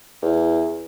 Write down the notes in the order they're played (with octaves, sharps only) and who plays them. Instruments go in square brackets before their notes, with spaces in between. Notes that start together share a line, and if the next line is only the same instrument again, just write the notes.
[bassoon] E2